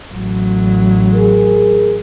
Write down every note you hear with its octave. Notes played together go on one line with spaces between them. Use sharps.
A1 F#3
G#4 A#4